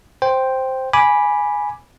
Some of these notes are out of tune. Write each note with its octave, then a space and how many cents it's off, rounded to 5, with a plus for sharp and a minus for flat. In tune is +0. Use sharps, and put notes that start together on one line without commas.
C5 +0 G5 +0
G#5 +0 B5 -10 D6 +0